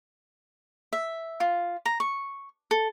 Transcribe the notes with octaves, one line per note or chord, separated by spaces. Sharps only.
E5
F4
A#5
C#6
A4